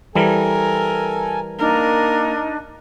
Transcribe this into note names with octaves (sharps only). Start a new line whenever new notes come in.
E3 G3 A4 A#4 G#5
A#3 D4 D#4 A#4